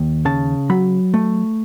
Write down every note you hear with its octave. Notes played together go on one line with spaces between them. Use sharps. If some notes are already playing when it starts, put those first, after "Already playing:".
Already playing: D#2
C#3 A5
F#3 B5
A3